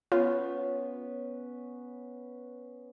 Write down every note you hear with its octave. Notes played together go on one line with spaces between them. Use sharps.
B3 C#4 F4 B4 C#5